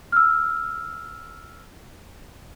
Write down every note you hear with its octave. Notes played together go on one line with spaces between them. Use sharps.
E6 F6